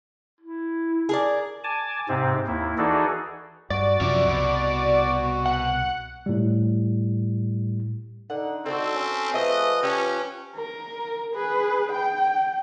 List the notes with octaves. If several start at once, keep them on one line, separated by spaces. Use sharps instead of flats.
E4
G#4 A#4 D5
G#5 A5 D6
G#2 C3 C4
D#2 E4
E3 D#4 F#4 G#4 A4 D5
G2 F#4 D5
F#2 C3 F3 C#4 E5
C2 B2
F#5
A2 G3
D3 D#4 F#5
D3 C4 F#4 A4
C#4
F3 A3 G#4 B4 D#5
F3 C#4 G4
A#4
G#4 B4
G5